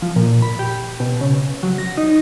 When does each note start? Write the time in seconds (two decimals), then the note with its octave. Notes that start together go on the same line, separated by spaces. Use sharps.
0.02 F3
0.16 A#2
0.42 B5
0.59 G4
1.00 B2
1.21 C#3
1.63 F#3
1.78 A#6
1.97 D#4